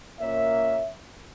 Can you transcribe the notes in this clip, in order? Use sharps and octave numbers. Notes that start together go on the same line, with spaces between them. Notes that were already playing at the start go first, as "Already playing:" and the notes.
A#2 A#3 C#4 C#5 E5